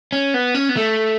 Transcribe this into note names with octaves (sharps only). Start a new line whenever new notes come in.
C#4
B3
C#4
B3
A3